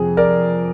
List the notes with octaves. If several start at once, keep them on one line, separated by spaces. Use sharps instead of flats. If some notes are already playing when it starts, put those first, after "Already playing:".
Already playing: F2 C3 G#4
A#4 D5